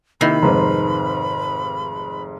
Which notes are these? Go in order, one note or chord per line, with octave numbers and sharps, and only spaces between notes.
C3 D#3 A#3 E4 G4 B5 C7
F1 G#2 B4 C5 A#5